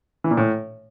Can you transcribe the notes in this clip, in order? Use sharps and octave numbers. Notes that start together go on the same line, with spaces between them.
E3
A#2
A2